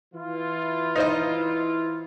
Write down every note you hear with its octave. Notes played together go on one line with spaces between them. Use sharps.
E3 E4 F4
D#4 C5 D#5